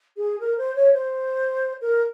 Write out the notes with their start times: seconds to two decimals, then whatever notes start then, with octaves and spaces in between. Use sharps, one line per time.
0.17 G#4
0.40 A#4
0.58 C5
0.75 C#5
0.93 C5
1.81 A#4